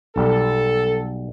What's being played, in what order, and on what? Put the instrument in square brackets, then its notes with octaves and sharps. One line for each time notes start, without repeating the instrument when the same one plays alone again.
[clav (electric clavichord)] B1 G3 [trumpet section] A4